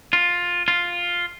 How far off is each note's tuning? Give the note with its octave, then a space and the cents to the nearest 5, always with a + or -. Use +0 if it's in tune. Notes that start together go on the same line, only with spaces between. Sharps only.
F4 +10
F4 +5